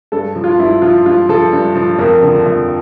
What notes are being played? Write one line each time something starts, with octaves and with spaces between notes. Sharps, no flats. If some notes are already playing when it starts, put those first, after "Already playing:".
G2 A4
F3
F4
G2 E4
F3 F4
G2 F4
F3 A4
G2
F3
F2 A#4
D3 F3
F2